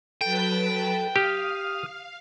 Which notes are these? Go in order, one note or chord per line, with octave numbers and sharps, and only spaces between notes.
F#3 A4 B4 G5 A5
G4 F5 D#6 F6